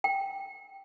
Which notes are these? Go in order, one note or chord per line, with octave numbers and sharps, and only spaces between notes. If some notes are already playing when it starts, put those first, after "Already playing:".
G5